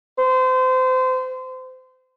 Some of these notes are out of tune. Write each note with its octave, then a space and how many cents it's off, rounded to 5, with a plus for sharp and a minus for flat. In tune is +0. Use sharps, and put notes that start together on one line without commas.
C5 -30